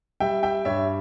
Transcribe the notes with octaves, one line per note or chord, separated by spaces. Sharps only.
G3 E5 G5
E5 G5
G2 C#5 E5